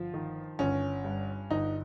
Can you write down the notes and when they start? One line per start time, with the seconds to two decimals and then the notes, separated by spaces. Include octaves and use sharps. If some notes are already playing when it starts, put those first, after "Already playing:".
Already playing: G1 F3 F4
0.14 D#3
0.59 G1 C#4
1.04 G2
1.51 G1 D#4